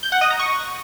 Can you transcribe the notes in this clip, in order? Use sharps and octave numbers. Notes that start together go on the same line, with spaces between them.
G6
F#5
D#5
A#5
C#6